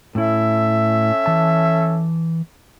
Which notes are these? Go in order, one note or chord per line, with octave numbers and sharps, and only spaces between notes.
A2 C#4 E4 A4 E5
E3 A5